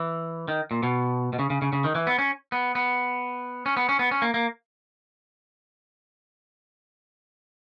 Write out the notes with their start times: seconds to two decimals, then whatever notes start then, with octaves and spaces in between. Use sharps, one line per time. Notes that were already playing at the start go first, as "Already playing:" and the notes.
Already playing: E3
0.48 D#3
0.71 A#2
0.83 B2
1.33 B2
1.39 C#3
1.50 C#3
1.62 C#3
1.73 C#3
1.84 D#3
1.95 E3
2.07 B3
2.19 C#4
2.52 B3
2.75 B3
3.66 C#4
3.77 B3
3.89 C#4
3.99 B3
4.11 C#4
4.22 A#3
4.34 A#3